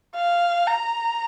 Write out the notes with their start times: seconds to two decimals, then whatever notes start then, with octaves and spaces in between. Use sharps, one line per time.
0.16 F5
0.67 A#5